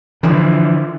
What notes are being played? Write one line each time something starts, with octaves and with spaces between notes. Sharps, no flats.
D3 E3 F3